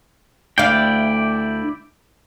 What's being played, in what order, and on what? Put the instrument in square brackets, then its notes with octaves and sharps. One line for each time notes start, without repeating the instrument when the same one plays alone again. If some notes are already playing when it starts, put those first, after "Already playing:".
[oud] D2 F5 [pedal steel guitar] E4 D5 G5